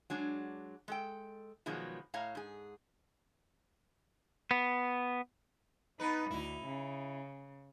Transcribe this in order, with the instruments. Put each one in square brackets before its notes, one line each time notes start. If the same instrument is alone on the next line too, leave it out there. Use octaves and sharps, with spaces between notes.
[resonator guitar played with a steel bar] F#3 G#3 D4
G#3 A4 G5
B2 D#3 F3 F#3 G#3
A2 C#5 F5 A#5
G#2 G#4
[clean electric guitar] B3
[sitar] B3 B4 [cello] D#4
[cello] D2 [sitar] D#4 E4
[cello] C#3